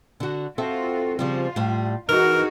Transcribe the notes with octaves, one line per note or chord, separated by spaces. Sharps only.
D3 F#4
C4 F4 F#4 A4 E5
C#3 F3 G3 F4
A2 G3
E3 D#4 F#4 G#4 A#4